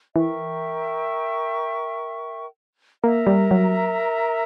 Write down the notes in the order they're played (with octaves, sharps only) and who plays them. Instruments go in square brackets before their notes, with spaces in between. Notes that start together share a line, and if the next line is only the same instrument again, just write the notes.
[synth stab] E3 [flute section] A#4 E5 G5 C#6
[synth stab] A#3 [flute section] A#4 E5 A#5
[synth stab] G3
F#3